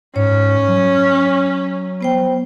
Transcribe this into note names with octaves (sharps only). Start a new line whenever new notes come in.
G#2 C#4 C#5
F#3
B3 C5 G5